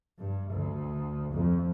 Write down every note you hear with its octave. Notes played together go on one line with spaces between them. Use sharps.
G2
D2
F2